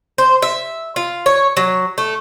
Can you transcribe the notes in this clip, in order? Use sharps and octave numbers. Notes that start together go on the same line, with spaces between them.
C5
E5
F4
C#5
F#3
A3